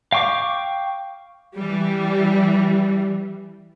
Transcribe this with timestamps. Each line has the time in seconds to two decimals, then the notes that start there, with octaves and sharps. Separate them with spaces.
0.12 F5 G5 C#6 D6
1.56 E3 G3